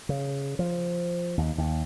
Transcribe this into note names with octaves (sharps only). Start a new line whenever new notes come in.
C#3
F3
D#2
D#2